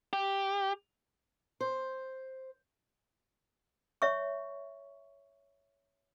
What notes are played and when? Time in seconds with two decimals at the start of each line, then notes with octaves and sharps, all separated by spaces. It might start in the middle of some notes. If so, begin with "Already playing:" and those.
0.13 G4
1.61 C5
4.02 C#5 E5 C#6